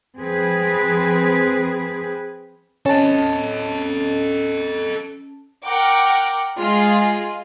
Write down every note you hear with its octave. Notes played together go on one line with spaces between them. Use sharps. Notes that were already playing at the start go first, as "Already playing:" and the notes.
F3 C4 G#4 B4
C#4 A4 D#5 A5
A#4 F#5 G5 D6
G#3 F4 G#4